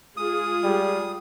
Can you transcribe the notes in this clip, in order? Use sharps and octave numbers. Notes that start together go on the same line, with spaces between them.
G#3 F4 G#4 D#6
G3